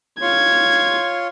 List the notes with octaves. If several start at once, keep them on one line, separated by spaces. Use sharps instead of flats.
F4 C#5 C6 G#6